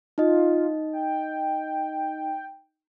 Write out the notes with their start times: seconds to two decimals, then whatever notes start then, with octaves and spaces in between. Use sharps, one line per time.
0.18 D#4 F4 D#5
0.93 G5